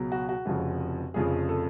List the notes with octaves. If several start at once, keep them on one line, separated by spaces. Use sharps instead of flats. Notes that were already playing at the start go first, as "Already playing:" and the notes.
Already playing: C#2 B2 F#3
F#4
F#4
F1 F2 C#3 F3
F1 F2 C#3 F3 G#4
A4